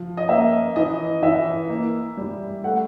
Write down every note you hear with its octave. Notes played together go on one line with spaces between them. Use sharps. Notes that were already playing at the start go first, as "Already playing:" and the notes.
Already playing: F3
D#5
A#3 E5
E3 D#5
E3 E5
A#3
G3
A3 F#5